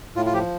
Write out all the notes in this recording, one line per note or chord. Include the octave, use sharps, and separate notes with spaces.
A2 F4
F4
F3 G4